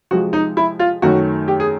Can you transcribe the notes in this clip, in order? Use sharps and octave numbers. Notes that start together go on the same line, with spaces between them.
C3 F3 G#3 F#4
D#4
E4
F4
F#2 D#3 F#3 A3 F#4
G4
G#4